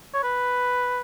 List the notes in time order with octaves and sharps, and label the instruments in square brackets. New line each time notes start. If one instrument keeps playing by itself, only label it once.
[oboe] C#5
B4